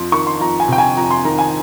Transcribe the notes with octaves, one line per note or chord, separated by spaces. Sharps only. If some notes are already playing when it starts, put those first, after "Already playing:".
Already playing: F2 C6
D#3 C#6
C6
F2 A#5
G#5
C3 G5
G#5
F2 A#5
C6
D#3 A#5
G#5